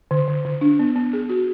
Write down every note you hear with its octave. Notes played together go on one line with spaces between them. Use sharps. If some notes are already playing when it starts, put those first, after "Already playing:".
D3
D3
D3
D4
B3
B3
G#4
F#4